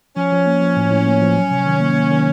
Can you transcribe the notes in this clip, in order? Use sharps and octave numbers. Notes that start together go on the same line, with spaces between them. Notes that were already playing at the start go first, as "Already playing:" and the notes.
F3 C#4
F3
A#3
F3
A2
A2
A#3
F3
F#3
C3
D#3
A#3
A#3
D#3